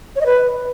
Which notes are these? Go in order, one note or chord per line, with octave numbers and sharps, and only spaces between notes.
C#5
D#5
B4